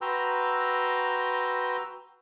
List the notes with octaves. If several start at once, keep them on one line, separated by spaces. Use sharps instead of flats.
F#4 B4 G5 A#5 C6 E6